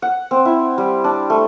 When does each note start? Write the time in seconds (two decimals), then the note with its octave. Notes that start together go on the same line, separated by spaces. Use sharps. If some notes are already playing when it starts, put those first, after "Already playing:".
0.02 F#5
0.31 C4
0.45 E4
0.78 G3
1.04 D4
1.30 A3